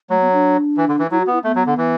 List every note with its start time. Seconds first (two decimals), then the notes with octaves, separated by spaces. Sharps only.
0.10 F#3 A3
0.21 B3
0.32 D4
0.77 E3
0.88 D3
0.99 E3
1.11 F#3 E4
1.21 F#4
1.27 B3
1.33 E4
1.44 A3 B3
1.56 F#3
1.66 D3
1.77 E3